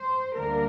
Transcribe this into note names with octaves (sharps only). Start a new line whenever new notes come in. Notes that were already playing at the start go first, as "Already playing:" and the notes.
Already playing: C5
D2 D3 G3 A#3 D4 A#4